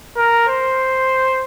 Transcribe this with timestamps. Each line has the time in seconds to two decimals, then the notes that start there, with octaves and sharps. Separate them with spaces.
0.17 A#4
0.48 C5